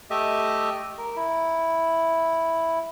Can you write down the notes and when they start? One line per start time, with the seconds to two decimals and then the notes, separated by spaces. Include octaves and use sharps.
0.10 A3 G4 D#5 E5
0.98 A#4
1.16 E4